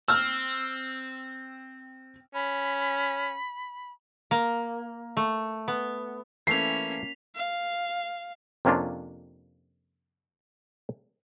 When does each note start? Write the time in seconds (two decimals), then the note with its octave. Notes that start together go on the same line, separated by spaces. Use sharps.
0.08 C4 E6 F6
2.34 C#4 B5
4.31 A#3
5.17 A3
5.68 B3
6.47 E3 A3 A#3 C#4 E4 B6 C7 F7
7.35 F5
8.65 F2 C3 A#3 C#4 D4 F4